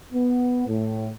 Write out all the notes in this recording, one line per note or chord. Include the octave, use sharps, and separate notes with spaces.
B3
A2